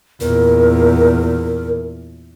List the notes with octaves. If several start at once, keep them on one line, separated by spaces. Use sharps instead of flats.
E2 A#2 A#4